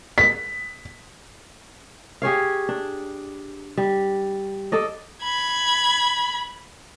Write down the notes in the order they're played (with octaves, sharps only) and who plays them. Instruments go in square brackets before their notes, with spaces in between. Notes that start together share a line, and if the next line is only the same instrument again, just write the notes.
[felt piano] B6
[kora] G4 G#4 C#5 F5
D4
G3
A4 D5 D#5
[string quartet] B5 G#6